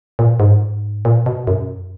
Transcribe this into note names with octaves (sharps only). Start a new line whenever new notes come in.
A#2
G#2
A#2
B2
F#2